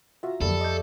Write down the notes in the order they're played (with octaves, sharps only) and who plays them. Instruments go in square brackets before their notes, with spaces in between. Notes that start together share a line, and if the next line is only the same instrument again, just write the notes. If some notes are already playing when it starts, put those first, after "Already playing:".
[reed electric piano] F4 F#4 [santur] E5 A#5
[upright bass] F2 [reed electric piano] D3 F#3 A#3 [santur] G3 [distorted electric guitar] A4
[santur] A3 D5 [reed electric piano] D#5 G6